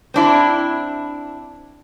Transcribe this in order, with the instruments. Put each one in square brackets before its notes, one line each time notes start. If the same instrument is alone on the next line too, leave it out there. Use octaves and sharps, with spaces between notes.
[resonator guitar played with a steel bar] C4 D4 E4